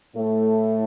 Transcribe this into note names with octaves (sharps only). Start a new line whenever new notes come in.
A2 A3